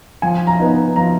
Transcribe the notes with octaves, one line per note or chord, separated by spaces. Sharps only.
F3 G#5
A#5
B3 D#4
F3 A#5